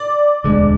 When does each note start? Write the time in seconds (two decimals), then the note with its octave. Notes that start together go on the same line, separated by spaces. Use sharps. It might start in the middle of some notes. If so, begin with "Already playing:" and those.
Already playing: D5
0.44 E1 D2 D3 G#3